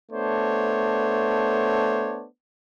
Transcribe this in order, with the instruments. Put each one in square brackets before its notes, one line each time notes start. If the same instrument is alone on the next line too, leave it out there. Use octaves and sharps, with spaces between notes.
[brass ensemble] A3 B3 D4 C5 C#5